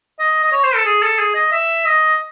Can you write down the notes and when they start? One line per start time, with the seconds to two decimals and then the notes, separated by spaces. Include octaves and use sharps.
0.19 D#5
0.44 D#5
0.52 C#5
0.64 C5
0.75 A4
0.86 G#4
1.03 A4
1.19 G#4
1.35 D#5
1.52 E5
1.85 D#5